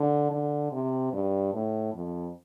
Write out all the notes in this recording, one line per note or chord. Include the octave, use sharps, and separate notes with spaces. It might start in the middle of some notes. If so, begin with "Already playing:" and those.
Already playing: D3
D3
C3
G2
A2
F2